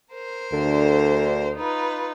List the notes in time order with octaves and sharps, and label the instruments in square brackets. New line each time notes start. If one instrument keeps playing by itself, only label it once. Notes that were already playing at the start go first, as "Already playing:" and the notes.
[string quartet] A#4 C5
[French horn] D2 [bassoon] D3
[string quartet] D#4 F4 B4